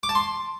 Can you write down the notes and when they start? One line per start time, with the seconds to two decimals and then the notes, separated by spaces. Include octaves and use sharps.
0.03 D6
0.09 A5
0.15 C6